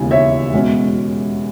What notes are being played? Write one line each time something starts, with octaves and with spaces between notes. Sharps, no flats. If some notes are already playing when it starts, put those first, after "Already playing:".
Already playing: E1 D#2 C#3 E3 G#5
C#5 E5
E2 B2 G#3 C#4